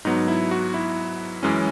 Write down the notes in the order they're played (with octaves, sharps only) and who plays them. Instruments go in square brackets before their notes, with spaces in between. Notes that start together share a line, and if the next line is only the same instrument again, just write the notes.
[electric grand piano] G#2 F#3 B3 D#4
E4
F#4
E4
F#2 E3 G#3 C#4